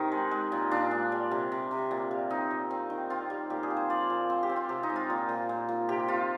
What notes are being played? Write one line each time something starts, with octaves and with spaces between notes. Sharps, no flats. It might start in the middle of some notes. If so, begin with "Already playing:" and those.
Already playing: C3 D#3 D#4 A#4
G#3
G#3
A#2
A#2 D4
G#3
G3
C3
C3
C3
A#2
G3
C4 D#4
A#2
C4
D#3
C4 F4
G3
A#2 G4
G#4
F3
C5
F3 D5
A#2
C4 C5
G4
C4
F4
C3 G4
D#4
G#3
F4
A#2
A#2
A#2
A#2
C3 G4
C3 F4